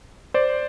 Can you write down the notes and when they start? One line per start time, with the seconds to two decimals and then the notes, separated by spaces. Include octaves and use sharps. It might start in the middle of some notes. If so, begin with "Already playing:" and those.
0.34 C5 D5